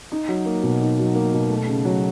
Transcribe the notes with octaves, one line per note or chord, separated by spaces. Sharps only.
D#4
F#3
A#3
B2
D#4
F#3
A#3
B2
A3
C#3
F#3